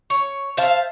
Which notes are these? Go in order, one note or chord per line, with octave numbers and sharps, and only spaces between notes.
C#5
C5 E5 F5 A5